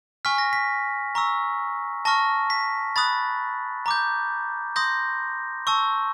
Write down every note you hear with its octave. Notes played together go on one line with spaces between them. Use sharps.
G#5 C#6 F6 B6
A#6
B6
A#5 C#6 E6
A5 C#6 F6 A#6
B6
B5 D#6 F#6 A6
A#5 D6 G6
C6 D#6 G6 A#6
A5 C#6 E6